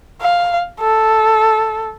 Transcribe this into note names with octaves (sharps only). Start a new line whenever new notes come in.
F5
A4